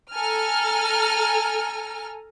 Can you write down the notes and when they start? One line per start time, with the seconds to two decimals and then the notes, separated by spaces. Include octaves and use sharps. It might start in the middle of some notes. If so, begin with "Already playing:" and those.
0.12 A4 G#5 A#5 F6